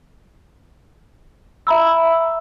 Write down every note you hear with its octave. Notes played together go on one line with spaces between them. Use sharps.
E5 A#5 B5 E6